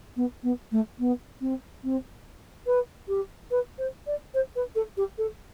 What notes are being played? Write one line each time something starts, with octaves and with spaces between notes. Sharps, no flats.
B3
B3
A3
B3
C4
C4
B4
G4
B4
C5
D5
C5
B4
A4
G4
A4